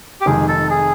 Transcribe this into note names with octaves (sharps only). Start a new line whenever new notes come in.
G4
F1 F2 C3 D#3 G#3 G#4
A4
G#4